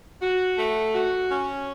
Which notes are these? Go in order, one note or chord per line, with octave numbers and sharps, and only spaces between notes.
F#4
A3
F#4
C#4